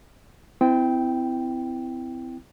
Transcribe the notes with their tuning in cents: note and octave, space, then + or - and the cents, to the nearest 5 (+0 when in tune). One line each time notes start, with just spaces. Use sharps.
C4 -30 E4 +0 G5 +0